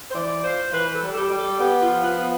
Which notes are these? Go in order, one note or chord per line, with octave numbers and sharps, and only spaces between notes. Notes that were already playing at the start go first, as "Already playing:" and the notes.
C5
E3 D5
F4 C5
E3 B4
A4
G3
A4
G4
G3
A4
B3 G4
F4
F3
B4
B3